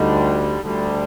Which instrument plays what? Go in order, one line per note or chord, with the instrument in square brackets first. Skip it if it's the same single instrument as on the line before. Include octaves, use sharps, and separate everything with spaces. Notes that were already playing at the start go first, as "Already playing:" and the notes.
Already playing: [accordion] D2 D3 G3 [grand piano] D#4
[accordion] D2 D3 G3